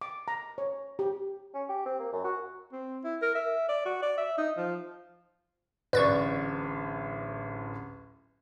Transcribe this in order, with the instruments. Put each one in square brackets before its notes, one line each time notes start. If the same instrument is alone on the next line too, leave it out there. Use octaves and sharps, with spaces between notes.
[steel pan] D6
A#5
C#5
G4
[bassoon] C#4
G4
C4
A#3
F#2
F#4
[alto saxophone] C4
E4
A#4
E5
D5
F#4
D5
E5
D#4
F3
[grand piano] D1 A1 [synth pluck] B4 D5 C#6